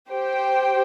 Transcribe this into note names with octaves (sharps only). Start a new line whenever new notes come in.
G4 C5 G5